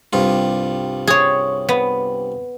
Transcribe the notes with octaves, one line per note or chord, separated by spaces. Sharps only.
C2 G2 F4
G#4 C#5
B3